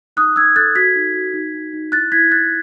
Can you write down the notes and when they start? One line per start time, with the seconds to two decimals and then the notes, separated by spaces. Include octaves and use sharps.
0.17 D#4 D#6 F#6
0.36 D#4 E6 G#6
0.56 A4 F#6 A6
0.75 F#4 G#6 B6
0.96 D#4
1.14 F#4
1.34 D#4
1.54 D#4
1.73 D#4
1.92 E4 F#6 A6
2.12 E4 G#6 B6
2.31 E4 F#6 A6